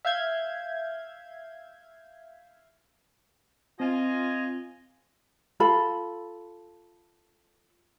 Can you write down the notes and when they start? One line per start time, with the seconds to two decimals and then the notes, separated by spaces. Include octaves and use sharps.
0.05 E5 F5 G6 G#6
3.80 C4 F4 D#5 G#5
5.60 F4 A4 B5